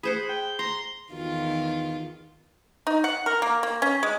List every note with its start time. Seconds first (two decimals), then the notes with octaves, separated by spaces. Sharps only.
0.03 G#4 C5 F#5 B5
0.29 G5
0.59 A#5 C6
1.12 E2 D#3 F4
2.87 D#4
3.04 F#5
3.26 A#4
3.42 A#3
3.63 A#3
3.82 C#4
4.03 G#3